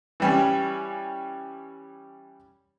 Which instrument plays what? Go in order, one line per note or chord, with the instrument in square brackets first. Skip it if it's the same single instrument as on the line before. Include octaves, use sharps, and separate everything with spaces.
[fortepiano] E3 G3 C#4